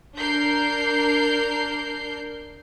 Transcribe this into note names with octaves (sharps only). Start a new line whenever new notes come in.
D4 A#4 G6 C7